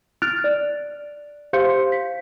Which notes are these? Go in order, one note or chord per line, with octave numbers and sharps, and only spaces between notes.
F6 F#6 A6 D7 F7
D5
G4 C5 F5 C6 G6 C#7
B6